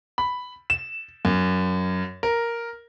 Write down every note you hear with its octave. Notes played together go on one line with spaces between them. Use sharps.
B5
E7
F#2
A#4